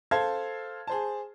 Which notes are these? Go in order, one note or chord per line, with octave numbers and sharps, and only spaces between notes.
A4 C5 F5 A5 G#6
G#4 C5 A5